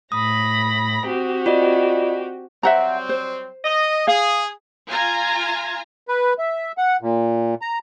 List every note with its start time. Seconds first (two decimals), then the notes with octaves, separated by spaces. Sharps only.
0.12 A2 B5 D#6 A#6
1.06 C4 F#4 G4
1.46 F4 D5 D#5
2.63 F#3 G3 C4 E5 F#5 A#5
3.09 C5
3.65 D#5
4.08 G#4 F5
4.88 F4 G#5 A#5
6.08 B4
6.39 E5
6.78 F#5
7.01 A#2
7.62 A#5